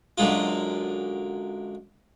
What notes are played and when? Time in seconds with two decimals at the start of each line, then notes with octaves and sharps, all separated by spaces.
0.18 F#2 D3 G#3 F4